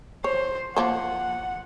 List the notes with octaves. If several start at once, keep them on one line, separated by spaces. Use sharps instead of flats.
C5 C#5
F3 A#3 C5 F#5